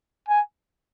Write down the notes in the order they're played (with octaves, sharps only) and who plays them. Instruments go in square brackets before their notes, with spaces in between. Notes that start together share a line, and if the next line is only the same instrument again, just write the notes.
[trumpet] G#5